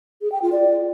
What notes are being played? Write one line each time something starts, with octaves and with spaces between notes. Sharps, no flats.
G#4
G5
F4
D5